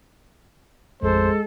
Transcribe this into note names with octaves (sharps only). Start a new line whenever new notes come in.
A1 F2 G#3 A4 C5